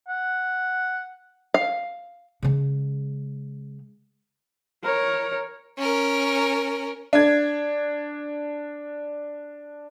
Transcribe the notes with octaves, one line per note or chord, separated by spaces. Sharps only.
F#5
F5
C#3 G#3
A#4 C#5
C#4 A#4
D4 G#6